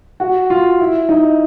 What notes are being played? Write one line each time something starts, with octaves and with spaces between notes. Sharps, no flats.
F#4
F4
E4
D#4